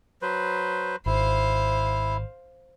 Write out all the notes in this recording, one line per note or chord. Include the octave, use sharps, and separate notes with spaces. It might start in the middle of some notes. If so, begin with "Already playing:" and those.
F#3 B4 C5
G#1 E4 C5 F5